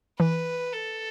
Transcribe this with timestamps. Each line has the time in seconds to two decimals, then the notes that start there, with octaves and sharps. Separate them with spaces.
0.19 E3 B4
0.72 A4